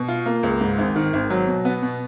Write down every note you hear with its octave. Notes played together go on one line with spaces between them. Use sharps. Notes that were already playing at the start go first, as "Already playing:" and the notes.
Already playing: B2
F4
A#3
C#2
G#2
G#1
D#3
G#1
F#3
B2
B3
B2